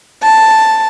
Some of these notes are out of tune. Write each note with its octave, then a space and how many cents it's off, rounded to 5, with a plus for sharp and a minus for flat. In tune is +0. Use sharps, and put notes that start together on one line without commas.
A5 +5